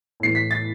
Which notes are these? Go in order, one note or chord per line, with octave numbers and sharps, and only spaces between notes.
A2 E3 C7
B6
A6